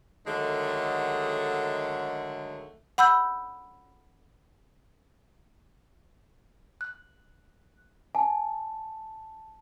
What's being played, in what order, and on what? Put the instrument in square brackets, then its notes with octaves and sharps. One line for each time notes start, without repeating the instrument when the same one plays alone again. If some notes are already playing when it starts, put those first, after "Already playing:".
[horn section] D3 D#3 F#3 G#3 A3
[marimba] F#5 B5 E6 G6
[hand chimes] F#6
[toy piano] G#5 [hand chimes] A5